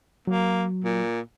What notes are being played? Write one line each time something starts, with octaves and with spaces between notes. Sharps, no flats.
F#3 A#3
A#2